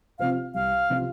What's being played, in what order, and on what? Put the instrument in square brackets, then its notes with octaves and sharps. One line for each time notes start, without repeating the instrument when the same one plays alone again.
[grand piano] C3 F3 C4 F4 [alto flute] F5
[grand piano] C2 [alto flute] F5
[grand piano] C3 F3 C4 F4